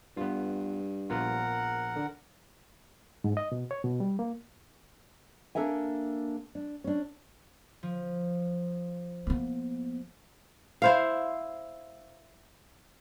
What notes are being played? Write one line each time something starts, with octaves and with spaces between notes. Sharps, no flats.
G2 B3 F4
A#1 B3 F4 A#4 F#5
D3
G#2
D#5
B2
C#5
B2
G3
A#3
A#3 D4 A4 A#4 E5 G#5
D4
C#4 D4
F3
A#3 B3
E4 C5 F5